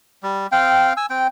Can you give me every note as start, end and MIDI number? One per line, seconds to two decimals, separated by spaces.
0.23 0.47 55
0.52 0.93 60
0.52 0.93 77
0.52 0.93 79
0.97 1.06 80
0.97 1.06 88
1.10 1.27 60
1.10 1.27 79